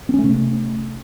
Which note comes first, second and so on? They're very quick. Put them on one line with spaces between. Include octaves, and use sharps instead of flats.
C4 C#4 A3 C3